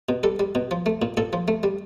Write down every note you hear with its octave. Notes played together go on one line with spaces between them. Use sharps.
B2
G3 A4
G3
B2
F3
A3
A#2
A#2 A4
F3
A3
G3